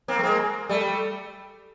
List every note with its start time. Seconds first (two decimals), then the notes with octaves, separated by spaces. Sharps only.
0.08 A#3 C4
0.19 A3
0.23 G#3 A#3
0.69 G3 A3